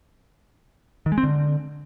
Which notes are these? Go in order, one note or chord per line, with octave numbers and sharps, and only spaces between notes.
D#3
G#3
C4
D3